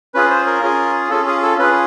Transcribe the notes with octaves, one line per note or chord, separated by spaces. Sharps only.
C#4 F4 G#4 B4
C5
A#4
C#4 F4 G#4
C#4 F4 G#4 A4
G#4
A4
C#4 F4 G#4 B4